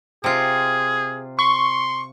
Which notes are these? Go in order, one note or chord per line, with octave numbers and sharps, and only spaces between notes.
C3 F4 G#4
C6 C#6